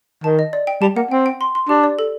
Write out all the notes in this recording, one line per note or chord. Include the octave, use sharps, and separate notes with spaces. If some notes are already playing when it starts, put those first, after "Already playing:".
D#3 A5
D#5
D5
G5
G3 A5
A#3 F#5
C4 G5
G5
C6
C6
D4 G4
D5
A4